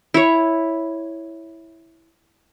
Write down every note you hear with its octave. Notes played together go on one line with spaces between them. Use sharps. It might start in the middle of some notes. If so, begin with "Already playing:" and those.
E4 C#5